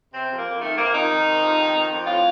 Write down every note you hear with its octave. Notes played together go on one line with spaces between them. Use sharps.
C3 C4
F2
A#3
F2
D#3 A3
C3 A#3
F2 D#4
D#3
C3
F2
D#3
F2
F2
A2 F4